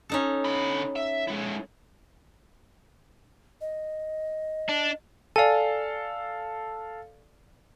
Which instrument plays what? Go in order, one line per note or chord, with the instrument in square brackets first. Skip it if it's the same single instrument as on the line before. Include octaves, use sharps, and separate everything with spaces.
[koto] C#4 D#4 A4
[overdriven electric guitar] D3 B5
E5
G#3 E4
[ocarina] D#5
[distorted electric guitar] D4
[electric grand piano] A4 F5 [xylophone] D5 G#5